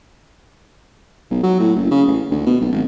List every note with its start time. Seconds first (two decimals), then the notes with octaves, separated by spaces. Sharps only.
1.31 B1
1.43 F#3
1.59 A2
1.76 F#1
1.91 C#3
2.08 A1
2.31 D2
2.47 B2
2.61 B1
2.72 G#1